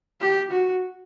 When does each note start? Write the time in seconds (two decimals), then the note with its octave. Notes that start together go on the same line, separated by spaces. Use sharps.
0.21 G4
0.51 F#4